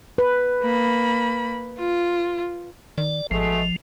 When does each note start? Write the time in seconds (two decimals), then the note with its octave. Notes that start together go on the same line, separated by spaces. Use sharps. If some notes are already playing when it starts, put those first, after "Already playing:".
0.18 B4
0.62 A#3 B5
1.79 F4
2.98 D#3 D5
3.31 A1 B2 F3 G#3 A3